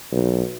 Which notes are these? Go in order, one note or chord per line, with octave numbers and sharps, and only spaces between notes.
B1